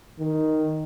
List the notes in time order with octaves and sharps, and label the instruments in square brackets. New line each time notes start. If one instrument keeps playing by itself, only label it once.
[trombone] D#3